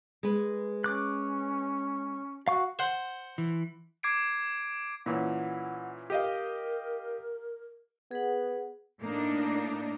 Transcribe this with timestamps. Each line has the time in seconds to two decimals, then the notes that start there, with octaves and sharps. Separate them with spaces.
0.23 G#3 B4
0.84 C#4 D6 F#6
2.48 F#4 F5 C#6
2.79 C5 F#5
3.38 E3
4.03 D6 G#6 C7 D7
5.06 A#2 E3 C#4 F#5
6.10 G4 A#4 D#5 F5
8.11 B3 G#4 B4 F#5
9.03 A2 A#3 D4 D#4